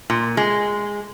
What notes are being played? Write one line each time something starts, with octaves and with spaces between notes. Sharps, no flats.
A#2
G#3